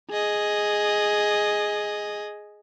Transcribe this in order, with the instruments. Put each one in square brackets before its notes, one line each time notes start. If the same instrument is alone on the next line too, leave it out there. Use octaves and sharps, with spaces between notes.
[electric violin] G#4 D#5